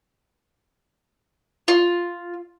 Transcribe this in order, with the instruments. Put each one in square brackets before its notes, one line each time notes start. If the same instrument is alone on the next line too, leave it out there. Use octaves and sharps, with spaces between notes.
[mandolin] F4